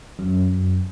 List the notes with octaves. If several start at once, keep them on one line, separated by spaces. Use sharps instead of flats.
F#2